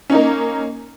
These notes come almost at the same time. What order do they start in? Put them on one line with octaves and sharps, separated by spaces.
C#4 D#4 A#3